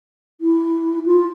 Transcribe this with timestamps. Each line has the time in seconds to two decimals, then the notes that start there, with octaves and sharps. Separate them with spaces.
0.41 E4
1.05 F4